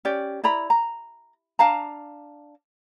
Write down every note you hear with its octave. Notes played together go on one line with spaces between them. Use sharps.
C#4 G4 D5
E4 D5 A#5 B5
A#5
D4 F5 A5 A#5